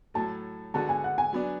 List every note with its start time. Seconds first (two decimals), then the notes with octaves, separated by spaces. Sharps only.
0.14 A2 F#3 A3 A5
0.74 D3 G#3 B3 F#4 A5
0.89 G#5
1.04 F#5
1.18 G#5
1.33 F#3 B3 D4